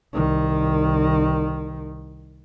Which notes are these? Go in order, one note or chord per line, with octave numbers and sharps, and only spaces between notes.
C2 D#3